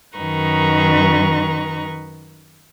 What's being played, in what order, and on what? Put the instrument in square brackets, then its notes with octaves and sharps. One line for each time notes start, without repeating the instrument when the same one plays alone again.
[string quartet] F#2 D#3 B4 A#5 C#6